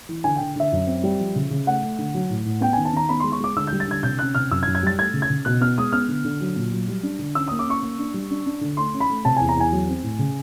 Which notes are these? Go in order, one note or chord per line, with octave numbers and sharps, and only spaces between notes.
E3
D3 G#5
D3 G5
D3 E5
F#2
C4
G3
F3
C#3
C#3
A3 F#5
A3
D3
F#3
A2
A2
B3 G5
D#3 G#5
A5
D#3 A#5
B3 B5
G#3 C6
C#6
G#3 D6
D3 E6
G6
G3
A6
D3 G#6
C3 G6
C#4 F#6
C3 F6
F#2 E6
G#6
F#2
G#6
G3 A6
A3 G#6
C#3
G#6
C#3
B2 F#6
B3 F6
G#3 D#6
B3 F6
D3
D3
F#3
A#2
F#3
G3
D4
D3
C#4 E6
A#3 D#6
D6
C#4 C#6
A#3
D4
G3
D4
D4
D3
A3 C6
C#4
B5
A3
C3 A5
E2 G#5
A#5
E2 G#5
F#3
C4
A2
C#3